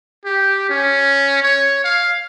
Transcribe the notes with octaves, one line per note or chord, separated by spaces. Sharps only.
G4
C#4
C#5
F5